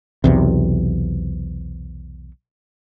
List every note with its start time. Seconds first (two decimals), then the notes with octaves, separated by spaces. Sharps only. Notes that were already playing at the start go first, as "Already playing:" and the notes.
0.24 B1 E2 C3